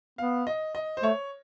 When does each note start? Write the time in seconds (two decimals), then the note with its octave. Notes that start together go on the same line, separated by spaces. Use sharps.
0.18 B3 F5
0.47 D#5
0.75 D#5
0.97 C5
1.03 A3 C#5